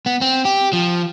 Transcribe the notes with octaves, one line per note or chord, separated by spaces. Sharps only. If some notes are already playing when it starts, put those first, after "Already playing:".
B3
C4
G4
F3